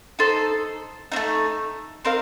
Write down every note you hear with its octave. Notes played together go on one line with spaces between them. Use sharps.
D#4 A4 C5
A3 C4 D#4
C4 D#4 A#4 F5